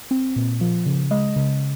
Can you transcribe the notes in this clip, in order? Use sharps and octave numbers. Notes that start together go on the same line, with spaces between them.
C4
A#2
F3
C#3
G#3 D#5
C#3